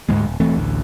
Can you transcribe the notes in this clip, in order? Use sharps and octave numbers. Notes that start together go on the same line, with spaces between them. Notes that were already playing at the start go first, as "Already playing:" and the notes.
D2 G#2 G3 G#3
D#1
E1 E3 A3 C4
A1 D2